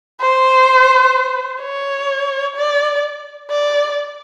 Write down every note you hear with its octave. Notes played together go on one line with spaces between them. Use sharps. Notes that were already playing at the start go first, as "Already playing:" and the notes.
C5
C#5
D5
D5